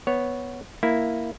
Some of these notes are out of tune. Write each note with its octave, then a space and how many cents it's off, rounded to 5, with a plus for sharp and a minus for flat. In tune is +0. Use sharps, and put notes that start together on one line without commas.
B3 +0 C#5 +0
A#3 +0 E4 +0